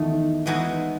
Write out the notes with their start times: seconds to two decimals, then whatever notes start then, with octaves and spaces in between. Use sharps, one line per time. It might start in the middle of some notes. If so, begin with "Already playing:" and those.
Already playing: E2 D#3 A3
0.46 E3 G#3 B3 D#4 F#4